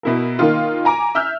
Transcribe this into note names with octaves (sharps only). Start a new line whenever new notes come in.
B2 E4 A#4
D#3 A#3 D#4 F4
G#5 A#5 D6
E5 E6 F6 G6